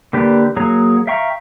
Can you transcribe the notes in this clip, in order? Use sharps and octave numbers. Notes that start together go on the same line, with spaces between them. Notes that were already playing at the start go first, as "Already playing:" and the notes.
D3 A#3 G4 B4 D5
F#3 A#3 G#4 C#5 A#5
E5 F5 G5 A#5 C#6